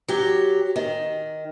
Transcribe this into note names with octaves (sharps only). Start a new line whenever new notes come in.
F#3 G4
D#3